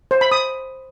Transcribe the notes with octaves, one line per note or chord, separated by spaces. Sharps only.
C5
B5
D#6